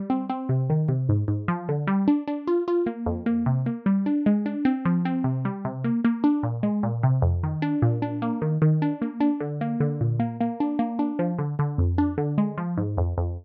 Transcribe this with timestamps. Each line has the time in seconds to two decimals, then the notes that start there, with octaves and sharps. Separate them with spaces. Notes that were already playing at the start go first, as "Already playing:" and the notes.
Already playing: G3
0.10 C4
0.30 C4
0.49 C3
0.70 D#3
0.89 C3
1.09 G#2
1.28 G#2
1.48 F3
1.69 D3
1.87 G3
2.08 D4
2.28 D4
2.47 F4
2.68 F4
2.86 A#3
3.06 F2
3.26 A#3
3.46 C3
3.66 A#3
3.86 G3
4.06 D4
4.26 G#3
4.46 D4
4.65 C4
4.85 F3
5.05 C4
5.24 C3
5.45 G3
5.65 C3
5.84 A#3
6.05 A#3
6.24 D4
6.43 A#2
6.63 G#3
6.83 A#2
7.03 C3
7.22 F2
7.43 D#3
7.62 D4
7.82 A#2
8.02 D4
8.22 A#3
8.42 D#3
8.62 D#3
8.82 D4
9.02 A#3
9.20 D4
9.41 D3
9.61 A#3
9.80 D3
10.01 A#2
10.20 A#3
10.41 A#3
10.60 D4
10.79 A#3
10.99 D4
11.19 F3
11.38 D3
11.59 D3
11.78 F2
11.98 D4
12.18 D3
12.38 G#3
12.58 F3
12.77 G#2
12.97 F2
13.18 F2